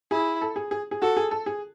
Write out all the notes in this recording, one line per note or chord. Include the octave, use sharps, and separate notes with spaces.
E4 G#4
A4
G#4
G#4
G#4
F#4 A4
G#4
A4
G#4